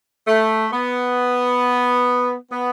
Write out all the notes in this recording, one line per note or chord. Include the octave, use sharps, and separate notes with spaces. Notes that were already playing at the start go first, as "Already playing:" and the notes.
A3
B3
B3